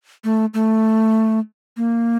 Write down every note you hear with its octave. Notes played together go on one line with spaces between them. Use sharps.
A3
A3
A#3